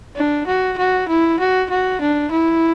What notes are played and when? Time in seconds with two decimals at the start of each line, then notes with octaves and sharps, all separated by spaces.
0.16 D4
0.47 F#4
0.78 F#4
1.09 E4
1.40 F#4
1.70 F#4
2.01 D4
2.32 E4